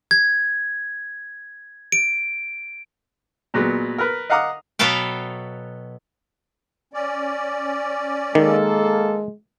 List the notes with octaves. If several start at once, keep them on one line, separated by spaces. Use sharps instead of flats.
G#6
D7
A#2 F#3 G#3 B3
A#4 B4
D#5 F5 F#5 A#5 D6 D#6
B2 F#3 B3 A4 F5 G5
C#4 D5
D#3 G#3 A#3 A4